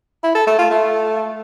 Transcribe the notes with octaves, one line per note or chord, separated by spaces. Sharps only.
E4
A4
A3
F4
A3